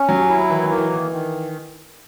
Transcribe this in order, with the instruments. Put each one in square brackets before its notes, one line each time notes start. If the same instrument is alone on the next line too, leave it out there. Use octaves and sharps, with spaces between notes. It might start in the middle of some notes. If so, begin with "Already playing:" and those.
Already playing: [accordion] C#4
[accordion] D#2 [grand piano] F#3
[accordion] E4
[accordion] D#3 [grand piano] E3
[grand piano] E3
[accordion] A#3
[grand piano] E3
[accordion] D#3
D#3